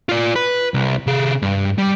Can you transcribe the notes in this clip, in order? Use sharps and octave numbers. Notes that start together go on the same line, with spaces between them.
F4 D5
B4
C2
C3 G#4
G2
G3